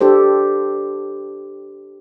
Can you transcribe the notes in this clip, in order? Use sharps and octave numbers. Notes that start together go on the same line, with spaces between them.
D4 G4 A4 C5